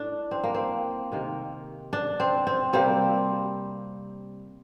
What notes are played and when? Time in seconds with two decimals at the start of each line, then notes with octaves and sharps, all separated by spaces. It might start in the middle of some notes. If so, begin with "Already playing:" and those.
Already playing: A2 A3 D4
0.31 C4
0.43 A#3
0.54 C4
1.12 C3 D#3 A#3
1.93 D4
2.20 C4
2.47 C4
2.73 C3 G3 A#3 C4